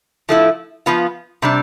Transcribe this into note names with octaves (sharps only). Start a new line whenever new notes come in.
F3 A3 E4
F3 B3 F4
C3 G3 D4